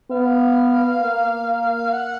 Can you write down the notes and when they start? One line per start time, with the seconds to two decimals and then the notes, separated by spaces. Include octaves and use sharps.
0.11 B3 F5
1.02 A#3
1.93 F#5